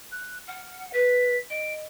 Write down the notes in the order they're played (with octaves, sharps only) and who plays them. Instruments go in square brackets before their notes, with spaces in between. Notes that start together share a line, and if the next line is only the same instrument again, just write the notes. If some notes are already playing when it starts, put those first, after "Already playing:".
[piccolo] F#6
[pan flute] F#5 [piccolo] F6
[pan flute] B4 [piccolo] B6
[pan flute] D#5 [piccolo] D7